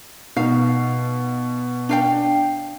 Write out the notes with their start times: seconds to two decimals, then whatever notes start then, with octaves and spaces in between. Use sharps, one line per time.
0.36 B2 D#4 F5
1.89 D4 F5 G5